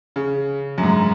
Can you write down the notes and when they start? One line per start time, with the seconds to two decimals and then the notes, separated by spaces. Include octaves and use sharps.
0.16 C#3
0.78 F#2
0.83 G#2